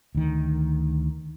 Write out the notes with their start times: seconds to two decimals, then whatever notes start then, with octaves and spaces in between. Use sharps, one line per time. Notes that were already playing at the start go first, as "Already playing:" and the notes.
0.15 D2 D#3